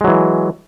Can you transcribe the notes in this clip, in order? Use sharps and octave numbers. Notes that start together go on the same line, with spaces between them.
E3 F#3 G#3